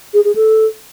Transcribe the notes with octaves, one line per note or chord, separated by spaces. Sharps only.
G#4
G#4
A4